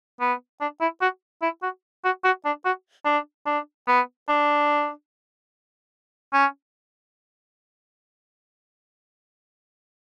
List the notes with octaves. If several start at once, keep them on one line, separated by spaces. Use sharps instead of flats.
B3
D4
E4
F#4
E4
F#4
F#4
F#4
D4
F#4
D4
D4
B3
D4
C#4